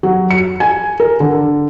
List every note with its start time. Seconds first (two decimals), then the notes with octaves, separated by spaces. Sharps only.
0.03 F#3
0.30 C#7
0.60 G#5
1.00 A#4
1.20 D3